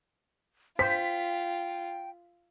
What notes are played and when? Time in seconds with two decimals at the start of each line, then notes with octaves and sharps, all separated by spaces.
0.79 F4 C5 G5 B6